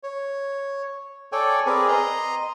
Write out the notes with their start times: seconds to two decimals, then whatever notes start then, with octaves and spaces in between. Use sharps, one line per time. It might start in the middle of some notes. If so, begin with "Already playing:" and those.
0.03 C#5
1.32 A4 C#5 D5 G5 G#5
1.66 C4 G#4 A#4 B4 D5 G#5
1.88 D#5 A#5 C6